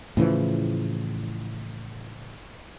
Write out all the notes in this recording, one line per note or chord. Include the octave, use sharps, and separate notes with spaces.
A2 C#3 E3 F3